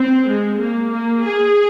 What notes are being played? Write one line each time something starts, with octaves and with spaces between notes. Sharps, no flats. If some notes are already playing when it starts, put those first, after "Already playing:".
Already playing: C4
G#3
A#3
A#3
G#4